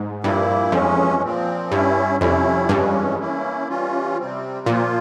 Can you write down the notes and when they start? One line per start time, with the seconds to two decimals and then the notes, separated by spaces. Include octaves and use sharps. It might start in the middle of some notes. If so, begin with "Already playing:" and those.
Already playing: G#2
0.24 G2 A#2 F3 A#3 E4
0.72 F2 E3 G#3 C#4
1.22 A#2 F3 C4
1.71 G2 G3 C#4 E4
2.20 F2 C3 G3 C#4 E4
2.69 G2 C#3 E3 G#3 C#4
3.19 E3 A#3 C#4 E4
3.68 E3 G3 C#4 F4
4.18 C3 G3 C4
4.66 A#2 F3 A#3 F4